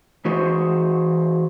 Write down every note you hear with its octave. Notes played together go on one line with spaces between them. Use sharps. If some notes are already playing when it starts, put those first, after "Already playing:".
E3 F#4 G#4 C5